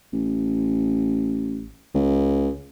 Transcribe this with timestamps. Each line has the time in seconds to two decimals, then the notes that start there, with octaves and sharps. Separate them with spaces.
0.13 A1
1.94 C#2